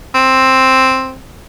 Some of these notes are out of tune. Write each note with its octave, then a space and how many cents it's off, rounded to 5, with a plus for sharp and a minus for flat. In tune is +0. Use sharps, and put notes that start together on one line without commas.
C4 +5